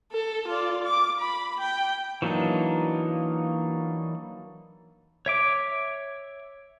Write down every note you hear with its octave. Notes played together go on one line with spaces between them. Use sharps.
A4
F4 D5
D6
B5
G5
E3 F#3 A#3 D4 D#4
C#5 E5 D6